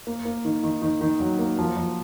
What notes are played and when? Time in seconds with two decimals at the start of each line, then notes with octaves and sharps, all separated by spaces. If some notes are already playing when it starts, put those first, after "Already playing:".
0.07 A#3
0.25 A#3
0.45 D#3
0.63 D#3
0.82 D#3
1.01 D#3
1.20 F#3
1.39 A#3
1.59 F3
1.77 F3